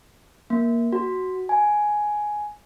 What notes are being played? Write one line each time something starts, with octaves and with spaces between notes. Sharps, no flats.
A#3
F#4
G#5